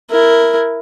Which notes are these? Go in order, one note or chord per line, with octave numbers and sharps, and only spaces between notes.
E4 A#4